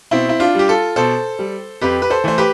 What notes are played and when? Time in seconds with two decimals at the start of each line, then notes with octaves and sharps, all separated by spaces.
0.11 B2 C4 E4
0.29 E4
0.40 D4 F4
0.55 G3 G4
0.68 F4 A4
0.96 B2 A4 C5
1.39 G3
1.81 F2 G4 B4
2.02 B4
2.10 A4 C5
2.24 E3 A3 C5
2.38 G4 B4